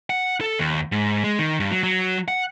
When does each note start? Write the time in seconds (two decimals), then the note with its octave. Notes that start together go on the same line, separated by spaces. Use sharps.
0.10 F#5
0.41 A4
0.59 D#2
0.92 G#2
1.24 G#3
1.39 D#3
1.60 G2
1.72 F#3
1.83 F#3
2.28 F#5